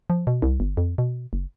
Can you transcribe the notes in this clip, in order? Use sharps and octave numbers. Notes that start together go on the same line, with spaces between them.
F3
B2
C2
G1
F2
B2
F#1